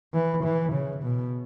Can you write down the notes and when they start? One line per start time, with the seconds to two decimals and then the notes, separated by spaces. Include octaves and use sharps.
0.14 E3
0.44 E3
0.73 C#3
1.03 B2